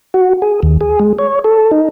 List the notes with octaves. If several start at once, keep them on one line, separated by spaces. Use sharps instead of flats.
F#4
G#4
D#2
G#4
G#3
C#5
A4
D#4